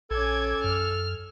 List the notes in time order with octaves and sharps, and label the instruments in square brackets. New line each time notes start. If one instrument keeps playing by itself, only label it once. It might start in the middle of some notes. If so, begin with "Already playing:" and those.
[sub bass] A#1 [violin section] C#4 D6 G#6 [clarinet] A4
[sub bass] F#2 [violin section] F6